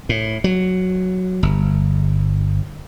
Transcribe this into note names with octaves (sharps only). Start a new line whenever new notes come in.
A2
F#3
G1